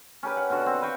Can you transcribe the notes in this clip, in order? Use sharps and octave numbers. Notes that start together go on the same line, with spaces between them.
C#4 G4 A#4 B4
F#5
B2 D3 F#4
C4
B4 F5 G5 C#6